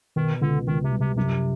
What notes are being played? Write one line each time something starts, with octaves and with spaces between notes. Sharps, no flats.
B2 D#3
C#2 D3
C#2 D#3
C3
G3
C3
F#2 C3